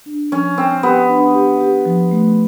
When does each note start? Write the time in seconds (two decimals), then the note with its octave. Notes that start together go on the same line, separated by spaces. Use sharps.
0.06 D4
0.32 F3 C#4
0.57 C4 D4
0.83 B3 G4
1.09 D4
1.35 G4
1.60 G4
1.86 F3
2.12 A3